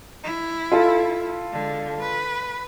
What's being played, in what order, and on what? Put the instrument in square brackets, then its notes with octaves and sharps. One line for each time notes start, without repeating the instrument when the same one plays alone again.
[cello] E4
[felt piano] F4 A4
[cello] D3 G#3
B4